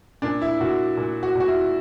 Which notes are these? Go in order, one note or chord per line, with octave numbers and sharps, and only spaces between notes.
A#2 D4
E4
A#2 F#4
A#2
F#4
A#2 F#4
E4